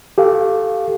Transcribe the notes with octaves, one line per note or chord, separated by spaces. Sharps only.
G4 A4 F5